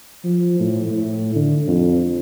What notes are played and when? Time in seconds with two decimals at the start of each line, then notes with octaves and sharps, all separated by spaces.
0.24 F3
0.60 A2
0.90 A2
1.36 D3
1.67 F2